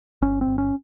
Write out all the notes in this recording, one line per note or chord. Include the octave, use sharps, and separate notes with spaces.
G1 C#4
C4
G1
C#4